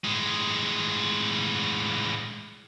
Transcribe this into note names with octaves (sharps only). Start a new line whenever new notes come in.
A2 G#3